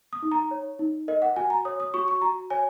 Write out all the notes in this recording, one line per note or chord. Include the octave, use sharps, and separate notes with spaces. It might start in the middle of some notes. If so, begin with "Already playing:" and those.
D#6
D#4
A#5
C#5
D#4
A#4 D#5
F#5
F#4 G#5
A#5
C#5 D#6
D#6
F#4 C#6
C#6
F#4 A#5
C#5 G#5